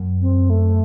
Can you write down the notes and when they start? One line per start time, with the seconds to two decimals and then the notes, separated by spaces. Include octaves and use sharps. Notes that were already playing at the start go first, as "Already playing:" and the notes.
Already playing: F#2
0.21 C4
0.50 A3